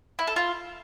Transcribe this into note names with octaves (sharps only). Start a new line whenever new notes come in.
E4
A4
F4